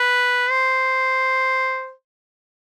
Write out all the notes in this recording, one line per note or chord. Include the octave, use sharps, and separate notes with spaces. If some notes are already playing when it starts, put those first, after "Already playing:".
Already playing: B4
C5